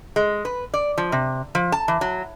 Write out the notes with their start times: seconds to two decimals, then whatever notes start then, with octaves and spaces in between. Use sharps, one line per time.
0.16 G#3
0.45 B4
0.74 D5
0.98 F3
1.12 C3
1.55 F3
1.72 A5
1.88 E3
2.01 F#3